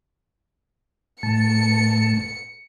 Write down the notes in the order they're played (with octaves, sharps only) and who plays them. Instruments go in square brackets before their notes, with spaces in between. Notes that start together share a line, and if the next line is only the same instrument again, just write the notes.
[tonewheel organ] A2 A5 [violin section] C#7